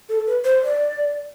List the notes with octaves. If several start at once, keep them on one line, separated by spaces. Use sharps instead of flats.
A4
B4
C5
D5